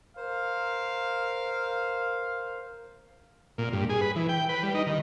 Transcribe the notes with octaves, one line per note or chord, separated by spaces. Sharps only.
A#4 C5 F5
A#2
G2
G#4
B4
E3
G5
B4
G3
D#4
D#3